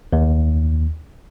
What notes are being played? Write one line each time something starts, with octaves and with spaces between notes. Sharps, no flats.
D#2